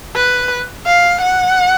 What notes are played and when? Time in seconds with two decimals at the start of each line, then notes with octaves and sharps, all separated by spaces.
0.15 B4
0.86 F5
1.21 F#5